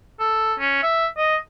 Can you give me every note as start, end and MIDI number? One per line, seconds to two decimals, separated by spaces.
0.20 0.54 69
0.59 0.80 61
0.82 1.07 76
1.17 1.37 75